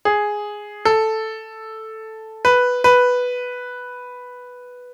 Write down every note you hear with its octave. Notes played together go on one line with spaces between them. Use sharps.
G#4
A4
B4
B4